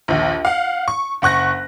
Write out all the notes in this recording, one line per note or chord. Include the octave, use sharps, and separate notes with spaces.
A#1 D#2
F5 F#5
C#6
F#1 F#5 C#6 F#6 A#6